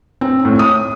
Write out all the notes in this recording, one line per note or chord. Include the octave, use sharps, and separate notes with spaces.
C4
A2
D#6